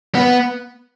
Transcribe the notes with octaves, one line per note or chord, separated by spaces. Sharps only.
B3